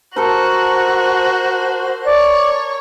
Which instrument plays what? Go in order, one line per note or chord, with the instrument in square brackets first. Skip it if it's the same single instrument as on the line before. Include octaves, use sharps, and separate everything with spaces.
[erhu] F#4 [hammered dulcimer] A4 A#4 [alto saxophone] C5
[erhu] C#5 [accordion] D5